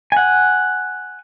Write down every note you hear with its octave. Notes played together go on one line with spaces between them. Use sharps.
F#5 G#5